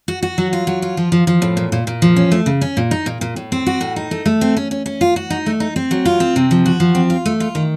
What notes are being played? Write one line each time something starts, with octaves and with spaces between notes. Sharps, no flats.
F#4
F#4
F#3
F4
F#3
F4
F3
F3
F3
A2
A#2
A#2
A#2
F3
C#4
A3
C#3
C#4
A#2
D#4
A#2
A#2
A2
C4
F#4
A2
D#4
A3
A3
C4
C#4
C#4
C#4
F4
F#4
D#4
A3
D#4
C4
F#3
F4
C4
C3
F3
F#4
F3
C4
F4
A3
F4
D#3